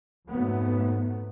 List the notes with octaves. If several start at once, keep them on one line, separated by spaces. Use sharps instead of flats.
F2 G#2 C#3 F#3 A3 B3